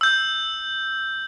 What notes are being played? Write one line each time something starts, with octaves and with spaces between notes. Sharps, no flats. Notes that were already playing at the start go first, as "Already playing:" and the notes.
E6 G6